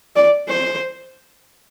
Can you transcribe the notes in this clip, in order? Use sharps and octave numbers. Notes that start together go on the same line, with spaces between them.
D5
C5